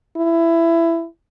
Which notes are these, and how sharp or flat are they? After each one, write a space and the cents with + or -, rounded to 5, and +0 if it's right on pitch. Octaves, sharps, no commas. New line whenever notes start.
E4 +15